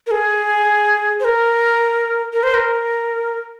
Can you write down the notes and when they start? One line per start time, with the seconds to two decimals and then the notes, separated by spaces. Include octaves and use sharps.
0.07 A#4
0.11 G#4
1.20 C5
1.25 A#4
2.33 A#4
2.43 C5
2.54 A#4